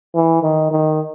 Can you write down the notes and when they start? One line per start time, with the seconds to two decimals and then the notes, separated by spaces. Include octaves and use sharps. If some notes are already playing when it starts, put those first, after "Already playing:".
0.15 E3
0.43 D#3
0.71 D#3